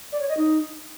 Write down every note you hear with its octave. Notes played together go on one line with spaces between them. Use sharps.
D5
C#5
D#5
D#4